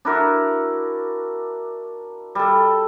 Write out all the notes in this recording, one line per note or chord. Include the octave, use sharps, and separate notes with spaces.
D4 E4 F#4 A#4
G3 A4